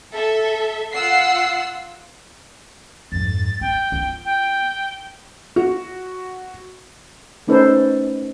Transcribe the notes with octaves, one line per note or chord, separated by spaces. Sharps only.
A4 E5
F4 F#5 E6 C7
F2 G#2 A6
C4 G5
B3 F4
G5
F#4
A3 C#4 D#4 A4 B4 C5